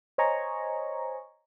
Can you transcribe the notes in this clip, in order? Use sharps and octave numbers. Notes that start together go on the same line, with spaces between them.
C5 C#5 D#5 G#5 A#5 C#6